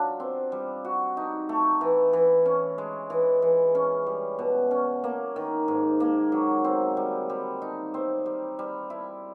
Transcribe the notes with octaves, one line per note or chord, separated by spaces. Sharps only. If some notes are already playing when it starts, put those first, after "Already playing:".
Already playing: F#3 D4 F4
C4
G3
F#4
D#4
A3
E3
E3
C#4
G#3
E3
E3
C#4
G3
B2
C#4
A#3
D#3
G#2
A#3
F#3
C4
G3
G3
D#4
C4
G3
G3
E4